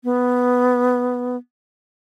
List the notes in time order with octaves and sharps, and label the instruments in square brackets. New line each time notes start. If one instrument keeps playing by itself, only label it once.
[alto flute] B3